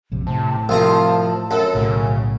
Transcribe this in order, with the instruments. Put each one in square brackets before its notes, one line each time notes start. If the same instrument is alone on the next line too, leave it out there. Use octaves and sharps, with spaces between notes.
[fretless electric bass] A#1 F2 C3
[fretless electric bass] A2 [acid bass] C3 [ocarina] A5
[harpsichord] C2 F4 A#5 [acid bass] F3
[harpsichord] F#2 [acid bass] A4
[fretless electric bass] B1 A2 A3 [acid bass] C#3